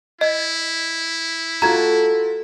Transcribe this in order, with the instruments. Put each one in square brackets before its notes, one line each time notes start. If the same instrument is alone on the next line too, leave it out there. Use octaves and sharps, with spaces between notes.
[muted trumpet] E4 [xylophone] D#5
[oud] A3 [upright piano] F4 F#4 [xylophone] A#5 G#6